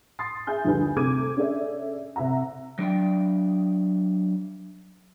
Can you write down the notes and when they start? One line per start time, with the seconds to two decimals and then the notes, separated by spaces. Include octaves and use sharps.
0.19 C6 D#6 A6 C7
0.47 G#4 E5 G#5 G6
0.65 A#1 D#2 D3 G3 B4 G#5
0.96 C3 A3 D6 G#6 D#7
1.37 C#4 D4 G#4 A4 D5 E5
2.16 C3 E5 F#5 A#5
2.79 F#3 D4 D5 G5